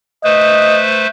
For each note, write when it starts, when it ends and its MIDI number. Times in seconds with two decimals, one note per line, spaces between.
0.24 1.07 57
0.24 1.07 71
0.24 1.07 72
0.24 0.81 75